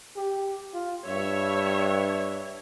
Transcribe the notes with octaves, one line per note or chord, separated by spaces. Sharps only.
G4
F4
G2 C#5 E5